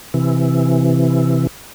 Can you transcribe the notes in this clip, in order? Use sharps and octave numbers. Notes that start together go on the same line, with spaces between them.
C3 E3